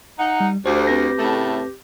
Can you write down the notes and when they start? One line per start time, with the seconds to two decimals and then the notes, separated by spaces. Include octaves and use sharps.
0.19 D#4 F#5
0.40 G3
0.66 D2 G4 C5
0.87 C4 B4 A#6
1.18 A2 C#3 A3